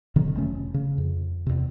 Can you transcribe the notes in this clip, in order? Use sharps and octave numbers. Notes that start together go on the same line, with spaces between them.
B2 D3 D#3 F#3
F1 A3 C#4
C#3
F2
E2 C3